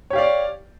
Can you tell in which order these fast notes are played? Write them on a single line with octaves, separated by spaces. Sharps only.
C#5 G4 F5 D5